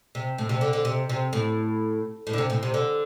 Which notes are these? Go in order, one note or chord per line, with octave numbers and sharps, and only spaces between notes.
C3
A2
C3
D3
D3
C3
C3
A2
A2
D3
C3
A2
C3
D3